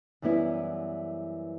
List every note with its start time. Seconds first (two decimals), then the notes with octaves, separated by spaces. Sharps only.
0.22 F#2 E3 G3 B3 E4